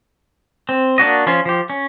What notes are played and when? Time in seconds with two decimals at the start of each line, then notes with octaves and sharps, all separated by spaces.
0.69 C4
0.98 A#3 D4 F#4 D#5
1.26 F3 C#4 F4
1.45 F3 G4
1.70 C#4